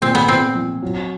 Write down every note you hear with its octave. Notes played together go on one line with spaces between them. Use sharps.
A#2 C4
B3
A#2 C4
F3
F#3